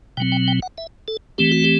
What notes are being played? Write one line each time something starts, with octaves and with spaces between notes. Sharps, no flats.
B2 F#3 C4 G5
G5
G5
F#5
E5
A4
E3 A3 C4 G4
F#4
G4